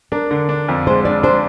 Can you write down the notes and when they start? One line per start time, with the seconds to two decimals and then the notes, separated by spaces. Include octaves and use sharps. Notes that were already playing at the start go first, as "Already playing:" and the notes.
0.12 D4 A#4
0.31 D3
0.49 D4
0.68 F2
0.87 G#3 C5
1.05 D4 D5
1.23 D4 C5